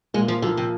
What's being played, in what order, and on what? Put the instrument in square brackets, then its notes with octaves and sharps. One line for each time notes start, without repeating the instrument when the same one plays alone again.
[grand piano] A#2 [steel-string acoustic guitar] G#3
[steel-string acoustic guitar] F3
[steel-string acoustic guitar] D3 [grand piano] F3 A#3
[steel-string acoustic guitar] C3